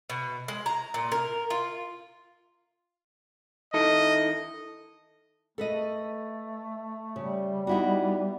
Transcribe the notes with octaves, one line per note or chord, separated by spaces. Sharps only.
B2
G#3
A#5
A#2
A#4
F4
D#3 E4 A4 D#5
A3 A4 B4 D#5
C#3 G3
B3 D#4 E4 F#4